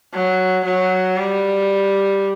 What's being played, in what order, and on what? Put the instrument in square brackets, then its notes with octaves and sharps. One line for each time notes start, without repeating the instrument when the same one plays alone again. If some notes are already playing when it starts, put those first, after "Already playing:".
[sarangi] F#3
F#3
G3